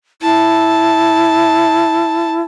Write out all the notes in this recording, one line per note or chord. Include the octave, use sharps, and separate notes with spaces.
E4 A5